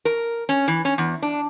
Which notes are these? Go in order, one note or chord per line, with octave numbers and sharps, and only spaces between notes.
A#4
C#4
E3
C#4
E2
D4